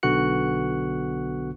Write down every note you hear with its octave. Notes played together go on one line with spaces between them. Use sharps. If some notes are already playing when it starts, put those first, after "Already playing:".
B1 D3 B3 F#4 F#6 C#7